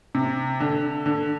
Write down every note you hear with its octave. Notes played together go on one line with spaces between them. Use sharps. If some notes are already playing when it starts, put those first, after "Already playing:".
C3
D3
D3